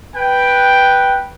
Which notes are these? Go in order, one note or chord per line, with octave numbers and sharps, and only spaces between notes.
B4 G5